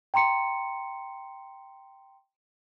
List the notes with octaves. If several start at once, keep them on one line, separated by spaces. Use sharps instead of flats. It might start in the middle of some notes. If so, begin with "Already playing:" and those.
G5 A#5 C6 C#7